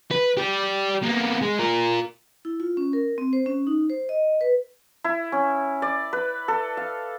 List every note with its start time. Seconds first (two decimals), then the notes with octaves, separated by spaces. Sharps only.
0.11 B4
0.37 G4 D5
1.03 A#3 B3
1.41 G#3
1.59 F4 A#4
2.45 E4
2.60 F4
2.77 C#4
2.93 A#4
3.18 C4
3.33 C5
3.46 C#4
3.67 D#4
3.90 C5
4.09 D#5
4.41 B4
5.04 E4
5.32 C#4
5.82 D5
6.13 B4
6.48 A4
6.77 F5